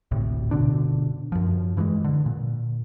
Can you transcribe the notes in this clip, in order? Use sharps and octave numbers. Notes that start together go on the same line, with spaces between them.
G#1 D2 A2 C3
G1 B2 D3 D4
F#2 F3
G2 E3 F#3 G#3
D3
A#2